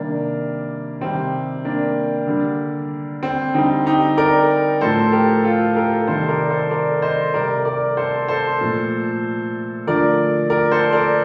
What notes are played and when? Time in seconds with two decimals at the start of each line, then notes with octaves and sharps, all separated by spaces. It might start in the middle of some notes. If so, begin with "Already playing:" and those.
Already playing: C3 D#3 G3 A#3 D4
1.01 C3 D#3 G3 C4
1.65 A#3 D4
2.27 D3 G3
3.23 C4
3.54 D3 G3 C4 D#4
3.86 D#4 G4
4.17 A#4 D5
4.81 A2 F3 A3 A4 C5
5.12 G4 A#4
5.44 F4 A4
5.76 G4 A#4
6.07 C3 D#3 G3 A4 C5
6.29 A#4 D5
6.50 A4 C5
6.71 A#4 D5
7.02 C5 D#5
7.34 C3 G3 A#4 D5
7.65 A#4 D5
7.97 A4 C5
8.28 A4 C5
8.61 A#2 F3 A3
9.87 D3 F3 A3 A#4 D5
10.50 A#4 D5
10.72 A4 C5
10.92 A#4 D5